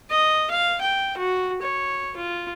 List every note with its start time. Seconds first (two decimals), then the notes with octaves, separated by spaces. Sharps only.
0.10 D#5
0.51 F5
0.82 G5
1.17 F#4
1.62 C#5
2.17 F4